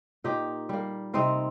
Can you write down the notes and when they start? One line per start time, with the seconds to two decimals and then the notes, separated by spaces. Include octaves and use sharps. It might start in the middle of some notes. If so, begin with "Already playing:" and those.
0.24 A#2 D#4 G4
0.69 G3 A#3
1.14 C3 C4 D#4